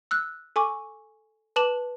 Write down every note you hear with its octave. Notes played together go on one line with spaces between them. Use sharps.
E6 F#6
A4 G#5 C#6 D6
B4 A5 D6 E7 F#7